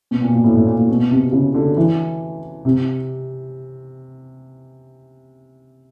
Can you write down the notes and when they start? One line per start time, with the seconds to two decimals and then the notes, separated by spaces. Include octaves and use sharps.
0.11 B2
0.22 A#2
0.33 A#2
0.44 A2
0.55 A2
0.67 A#2
0.77 A#2
0.89 B2
1.11 C3
1.32 C#3
1.54 D3
1.77 E3
2.65 C3